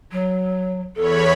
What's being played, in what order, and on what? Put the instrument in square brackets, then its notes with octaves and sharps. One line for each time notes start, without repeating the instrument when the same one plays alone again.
[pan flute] F#3
[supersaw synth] E2 C#5 B5 [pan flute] A4